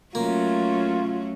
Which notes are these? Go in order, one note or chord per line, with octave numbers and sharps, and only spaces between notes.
F#3 A3 A#3 C#4 F4